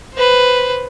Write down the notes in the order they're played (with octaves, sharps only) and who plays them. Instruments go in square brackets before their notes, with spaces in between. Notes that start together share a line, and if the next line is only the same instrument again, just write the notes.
[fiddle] B4 C5